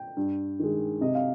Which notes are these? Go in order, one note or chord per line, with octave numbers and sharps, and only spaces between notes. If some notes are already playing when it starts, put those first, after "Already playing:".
Already playing: G5
G2
D#3 G#3
C3 D#5
F5